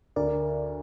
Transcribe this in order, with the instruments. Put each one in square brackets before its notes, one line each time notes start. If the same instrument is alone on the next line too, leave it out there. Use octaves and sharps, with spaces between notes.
[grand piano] D2 [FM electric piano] A#4 D5